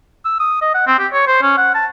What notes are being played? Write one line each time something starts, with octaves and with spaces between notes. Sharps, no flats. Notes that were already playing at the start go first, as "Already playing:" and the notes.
E6
D#6
D#5
F#5
C4
G4
C#5
C5
C#4
F#5
A5